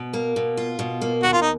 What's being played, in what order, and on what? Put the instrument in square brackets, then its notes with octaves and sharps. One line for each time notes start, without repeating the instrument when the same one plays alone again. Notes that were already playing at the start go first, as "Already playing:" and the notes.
Already playing: [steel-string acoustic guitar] B2
A#3
B2
F4
B2
A#3
[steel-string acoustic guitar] D#2 [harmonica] F#4
[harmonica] F4
D#4